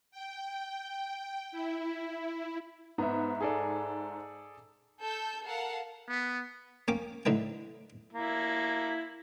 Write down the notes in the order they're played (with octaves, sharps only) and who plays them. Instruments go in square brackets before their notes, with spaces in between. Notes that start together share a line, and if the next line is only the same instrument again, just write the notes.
[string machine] G5
E4
[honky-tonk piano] G#2 E5 [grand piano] B3
[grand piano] G#4 A4 D5
[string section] A4 G6
A4 A#4 F5 F#5 A5
[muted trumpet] B3
[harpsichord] A#3 C#4 G5 D6
A2 D3 D#4 B4 G5
[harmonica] A#3 E4